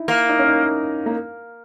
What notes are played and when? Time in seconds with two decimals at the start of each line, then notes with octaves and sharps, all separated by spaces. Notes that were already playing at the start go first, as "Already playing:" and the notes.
Already playing: D#4 E4
0.08 A#3
0.29 D#4
0.38 C#4
0.48 D#4
1.06 A#3